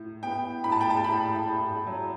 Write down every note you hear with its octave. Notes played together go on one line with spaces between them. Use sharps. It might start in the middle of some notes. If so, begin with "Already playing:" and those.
Already playing: A2
B3 G5
A2 B5
A5
G5
A5
A2 B5
A2
F#3